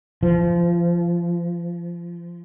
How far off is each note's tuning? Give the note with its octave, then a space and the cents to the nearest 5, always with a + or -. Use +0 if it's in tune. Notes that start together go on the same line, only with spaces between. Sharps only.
F3 -25